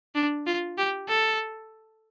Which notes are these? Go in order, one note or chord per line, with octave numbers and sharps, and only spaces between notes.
D4
F4
G4
A4